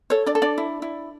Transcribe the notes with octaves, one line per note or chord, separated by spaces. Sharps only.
A4 C#5
D4 D5
A4
D4 D5
E4
E4